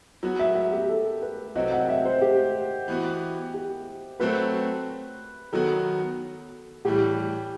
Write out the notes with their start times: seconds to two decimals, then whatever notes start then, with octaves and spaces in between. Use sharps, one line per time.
0.23 F#3 B3 F#4
0.39 E5
0.55 E5
0.72 G4
0.89 A4
1.22 B4
1.55 C3 F#3 C4 F#4 D#5
1.71 F#5
1.89 E5
2.05 C5
2.22 G4
2.88 E3 B3 F#4
3.54 G4
4.20 F#3 A3 C4 F#4 B4
5.52 D#3 F#3 B3 F#4 A4
6.85 A2 E3 G3 G4